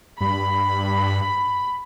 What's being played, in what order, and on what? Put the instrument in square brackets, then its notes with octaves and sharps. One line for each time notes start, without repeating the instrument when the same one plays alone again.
[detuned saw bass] G2 [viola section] B5